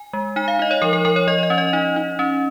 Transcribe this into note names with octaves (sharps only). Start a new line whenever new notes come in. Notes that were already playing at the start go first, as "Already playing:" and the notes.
Already playing: G#5
G#3
D#4 G#5
F5
D#4 D#5
C#5
F3 A#4
A#4
F3 A#4
C#5
F3 D#5
D#5
C#4
D#5
D#4
D#4
C#4